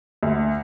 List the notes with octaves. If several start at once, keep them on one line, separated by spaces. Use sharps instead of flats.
D2